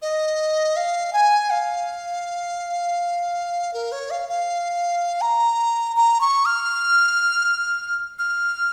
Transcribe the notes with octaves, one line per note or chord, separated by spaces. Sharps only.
D#5
F5
G#5
F5
A#4
C#5
F5
F5
A#5
A#5
C#6
F6
F6